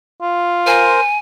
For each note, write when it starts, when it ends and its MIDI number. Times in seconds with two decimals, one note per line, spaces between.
0.22 0.92 65
0.67 1.00 70
0.67 1.00 72
0.67 1.18 80